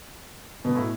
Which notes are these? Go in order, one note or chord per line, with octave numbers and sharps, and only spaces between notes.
B2
A2